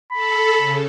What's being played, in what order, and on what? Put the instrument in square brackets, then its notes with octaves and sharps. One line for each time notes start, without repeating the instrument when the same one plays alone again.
[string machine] A4 [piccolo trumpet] B5
[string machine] C#3